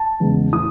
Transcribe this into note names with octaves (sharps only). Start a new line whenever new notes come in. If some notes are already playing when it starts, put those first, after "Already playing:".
Already playing: A5
E2 C#3 G#3
A2 E3 D#6